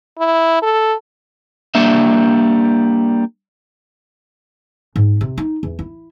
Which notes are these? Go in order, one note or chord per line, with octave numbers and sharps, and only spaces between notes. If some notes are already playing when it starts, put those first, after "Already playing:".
E4
A4
G3 A#3 D4 E5
G#2
C3
D#4
E2
E4